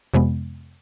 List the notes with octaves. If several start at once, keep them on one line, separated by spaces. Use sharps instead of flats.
F2 C3 G#3 B3